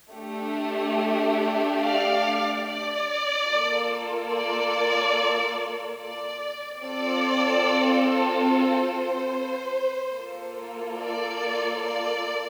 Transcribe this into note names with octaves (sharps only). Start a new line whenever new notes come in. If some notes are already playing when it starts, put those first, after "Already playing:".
A3 D4 G4
D5 F5
D5
A#3 F4 A4
D5
D5
C4 F4 A4 D5
C5
A#3 F4 A4
D5
D5